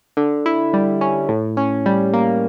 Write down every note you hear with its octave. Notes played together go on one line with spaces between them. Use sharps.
D3
E4
G3
C#4
A2
C#4
G3
A#3